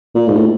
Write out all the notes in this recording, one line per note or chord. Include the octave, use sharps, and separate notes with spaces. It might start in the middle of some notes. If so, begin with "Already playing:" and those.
A#2
G#2
A2